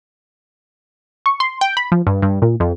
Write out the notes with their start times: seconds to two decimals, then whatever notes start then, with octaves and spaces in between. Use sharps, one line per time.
1.26 C#6
1.40 C6
1.61 G5
1.77 B5
1.92 F3
2.07 G2
2.22 G2
2.42 A#2
2.60 F2